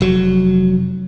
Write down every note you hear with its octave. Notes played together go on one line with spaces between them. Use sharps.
F1 F#3